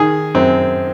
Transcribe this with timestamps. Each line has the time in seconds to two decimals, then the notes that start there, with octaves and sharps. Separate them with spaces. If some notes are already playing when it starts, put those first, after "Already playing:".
Already playing: D#3 G#4
0.34 F#2 C4